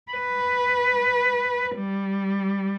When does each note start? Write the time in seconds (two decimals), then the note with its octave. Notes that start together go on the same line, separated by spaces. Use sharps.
0.12 B4
1.77 G3